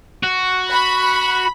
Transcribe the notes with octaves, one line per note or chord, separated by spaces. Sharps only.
F#4
B5